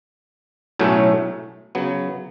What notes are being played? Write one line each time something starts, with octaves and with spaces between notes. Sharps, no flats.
B1 A2 F#3 A3 C#4
C#3 F#3 B3